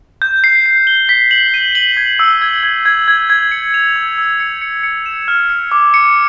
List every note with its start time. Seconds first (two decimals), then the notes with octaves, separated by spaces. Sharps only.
0.22 G6
0.44 C7
0.66 C7
0.87 G7
1.09 B6
1.31 F#7
1.54 D#7
1.75 F#7
1.97 G#6
2.19 E6
2.41 G#6
2.63 G#6
2.85 G#6
3.08 G#6
3.30 G#6
3.51 C#7
3.74 F7
3.96 E6
4.18 E6
4.40 C#7
4.62 C#7
4.83 C#7
5.06 E7
5.28 F6
5.50 C#7
5.72 D6
5.94 C#7